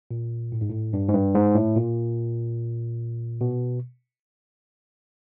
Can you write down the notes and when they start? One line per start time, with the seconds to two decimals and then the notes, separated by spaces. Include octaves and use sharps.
0.11 A#2
0.52 A2
0.61 G#2
0.70 A2
0.93 G2
1.09 G#2
1.14 G2
1.35 G#2
1.55 A2
1.76 A#2
3.41 B2